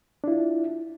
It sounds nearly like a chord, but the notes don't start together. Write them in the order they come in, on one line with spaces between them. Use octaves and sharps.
D4 E4 F4